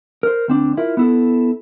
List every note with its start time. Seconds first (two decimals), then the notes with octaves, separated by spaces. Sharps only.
0.23 A#4 C5
0.48 D2 C4 D4
0.77 E4 F4 A#4
0.97 B3 E4 A4